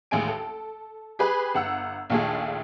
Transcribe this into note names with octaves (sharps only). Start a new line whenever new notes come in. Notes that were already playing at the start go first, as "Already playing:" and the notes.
A1 D#2 G#3 G#5 D7
A4
G4 G#4 B4
G1 F#5 E6
A#1 D#2 A3 F4 G#4